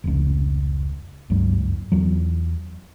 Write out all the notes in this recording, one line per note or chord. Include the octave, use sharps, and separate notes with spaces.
F1 C#2
F#1 C#2 G2 F#3
E2 F#3